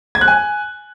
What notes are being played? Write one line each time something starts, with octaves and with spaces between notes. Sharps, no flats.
G#6
F#6
G#5